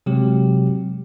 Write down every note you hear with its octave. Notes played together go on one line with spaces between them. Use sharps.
C3 F#3 G#3 G4